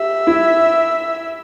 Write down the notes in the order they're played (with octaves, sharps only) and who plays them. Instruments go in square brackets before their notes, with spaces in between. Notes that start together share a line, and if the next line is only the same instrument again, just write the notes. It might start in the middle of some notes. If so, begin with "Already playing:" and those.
Already playing: [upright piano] G4 [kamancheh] E5
[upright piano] E4